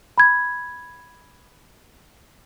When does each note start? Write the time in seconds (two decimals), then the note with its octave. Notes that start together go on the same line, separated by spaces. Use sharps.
0.18 B5 G#6